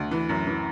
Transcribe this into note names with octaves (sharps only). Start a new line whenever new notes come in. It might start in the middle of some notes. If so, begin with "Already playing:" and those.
Already playing: D2
E3
F#2
E3